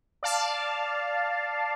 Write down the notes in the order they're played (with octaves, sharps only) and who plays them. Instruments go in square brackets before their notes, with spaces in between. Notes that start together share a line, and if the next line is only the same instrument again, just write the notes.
[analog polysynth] D5 F5 A5